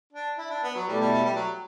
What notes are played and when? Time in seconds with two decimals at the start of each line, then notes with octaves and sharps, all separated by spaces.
0.13 D4
0.38 E4
0.50 D4
0.63 B3
0.75 F#3
0.87 B2 G3 A3 E4 A4 D5
1.01 G3
1.13 G3
1.25 G3
1.36 F#3